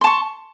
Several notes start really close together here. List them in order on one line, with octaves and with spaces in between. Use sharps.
C6 A5 C#6